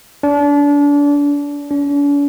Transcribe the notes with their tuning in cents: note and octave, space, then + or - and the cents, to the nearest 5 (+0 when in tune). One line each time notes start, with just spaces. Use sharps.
D4 -30
D4 -45